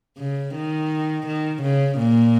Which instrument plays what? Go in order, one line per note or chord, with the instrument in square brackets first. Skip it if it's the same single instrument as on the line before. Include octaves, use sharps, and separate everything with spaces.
[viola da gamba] C#3
D#3
D#3
C#3
A#2